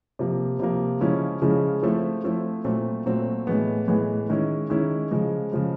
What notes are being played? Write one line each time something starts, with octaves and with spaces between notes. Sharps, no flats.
C3 F3 A#3
C3 F3 A#3
C#3 F3 G#3 C#4 E4
C#3 F3 G#3 C#4 E4
F3 A3 C4 E4
F3 A3 C4 E4
A#2 F#3 A3 C4
A#2 F#3 A3 C4
A2 E3 G#3 B3
A2 E3 G#3 B3
D#3 G#3 C#4 E4
D#3 G#3 C#4 E4
C#3 F3 G#3
C#3 F3 G#3